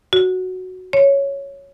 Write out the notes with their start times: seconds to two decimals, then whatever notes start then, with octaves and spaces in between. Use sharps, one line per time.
0.13 F#4
0.93 C#5